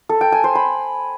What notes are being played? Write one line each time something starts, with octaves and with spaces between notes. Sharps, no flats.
A4
G5
G#5
C5
B5